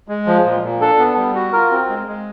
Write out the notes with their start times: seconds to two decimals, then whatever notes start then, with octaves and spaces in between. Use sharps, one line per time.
0.08 G#3
0.27 F3
0.45 A#2
0.63 A#2
0.81 D4 A4
0.98 B3
1.17 G3
1.35 F#4
1.53 F4 A#4
1.71 C4
1.89 G#3
2.07 G#3